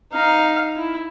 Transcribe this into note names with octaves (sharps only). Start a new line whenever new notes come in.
D#4 F5
E4